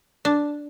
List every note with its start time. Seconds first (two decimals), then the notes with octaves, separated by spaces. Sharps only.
0.25 D4